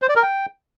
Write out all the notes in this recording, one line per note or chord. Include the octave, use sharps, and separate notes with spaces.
C5
D5
A#4
G5